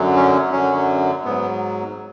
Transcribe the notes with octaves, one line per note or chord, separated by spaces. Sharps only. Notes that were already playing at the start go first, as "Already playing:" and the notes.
Already playing: F#2 D3 F#3
C#4
F#2 D3 F#3 C#4
G#2 F#3 B3